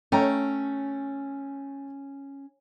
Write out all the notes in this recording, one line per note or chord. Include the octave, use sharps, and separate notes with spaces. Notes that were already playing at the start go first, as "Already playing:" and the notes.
A3 C#4 G5 A#5